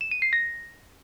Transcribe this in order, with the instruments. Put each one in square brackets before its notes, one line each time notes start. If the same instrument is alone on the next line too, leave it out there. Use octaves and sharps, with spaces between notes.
[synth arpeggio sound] E7
D#7
C7
A#6